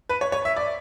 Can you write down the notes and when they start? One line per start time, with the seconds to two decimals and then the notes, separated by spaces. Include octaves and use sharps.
0.09 B4
0.21 C#5
0.32 C#5
0.45 E5
0.56 D5